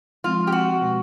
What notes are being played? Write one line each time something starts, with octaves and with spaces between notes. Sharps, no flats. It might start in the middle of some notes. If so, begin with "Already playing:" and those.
F3 G#3 C4 F4
G4
F#4
B2 G#3